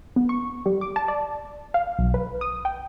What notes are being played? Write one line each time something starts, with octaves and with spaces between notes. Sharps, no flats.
B3
C#6
G3
D6
A5
D5
F5
B1
B4
D#6
G5